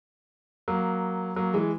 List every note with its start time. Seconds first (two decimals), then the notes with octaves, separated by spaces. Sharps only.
0.68 F#3 A#3
1.36 F#3 A#3
1.54 E3 G#3